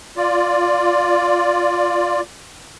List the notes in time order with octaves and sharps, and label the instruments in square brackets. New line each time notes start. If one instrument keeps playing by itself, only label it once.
[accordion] F4 D5